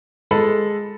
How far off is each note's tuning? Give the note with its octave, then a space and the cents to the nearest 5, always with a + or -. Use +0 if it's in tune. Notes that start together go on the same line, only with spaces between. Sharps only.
G#3 +0 A4 +0 B5 +0